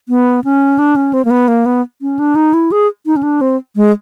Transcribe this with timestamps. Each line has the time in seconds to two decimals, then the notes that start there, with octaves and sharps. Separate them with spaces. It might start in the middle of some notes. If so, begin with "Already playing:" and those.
0.09 B3
0.44 C#4
0.79 D4
0.96 C#4
1.13 C4
1.25 A#3
1.30 B3
1.48 A#3
1.66 B3
2.02 C#4
2.19 D4
2.35 D#4
2.54 E4
2.72 G#4
3.06 D#4
3.16 C#4
3.23 D4
3.41 C4
3.76 G#3